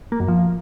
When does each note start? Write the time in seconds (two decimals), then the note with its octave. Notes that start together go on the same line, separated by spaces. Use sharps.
0.12 A#3
0.20 F#2
0.28 F3